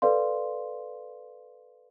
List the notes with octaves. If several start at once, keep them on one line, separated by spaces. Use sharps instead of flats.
A4 B4 D5 F5 C6